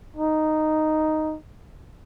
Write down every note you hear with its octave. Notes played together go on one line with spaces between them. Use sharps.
D#4